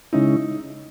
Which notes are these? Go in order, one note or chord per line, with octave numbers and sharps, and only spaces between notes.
C#3 G#3 C#4 D#4 E4